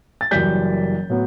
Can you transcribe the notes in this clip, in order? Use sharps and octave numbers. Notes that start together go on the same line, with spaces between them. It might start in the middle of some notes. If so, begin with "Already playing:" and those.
A6
F#1 F#2 E3 G3 G6 B6
A2 F#3 B3